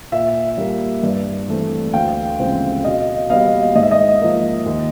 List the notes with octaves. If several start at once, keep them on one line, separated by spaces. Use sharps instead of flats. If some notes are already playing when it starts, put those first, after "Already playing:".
A#2 E5
G3 A#3
G2
E3 A3 C4
D2 F5 G5
C#3 F3 G#3 C4
B2 D#5 F5
G3 B3 D#5 F5
G#2 D#5
E5
D#5
F3 A#3
D#2